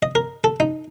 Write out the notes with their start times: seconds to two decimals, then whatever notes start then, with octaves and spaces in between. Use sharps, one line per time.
0.03 D#5
0.15 A#4
0.44 A4
0.60 D#4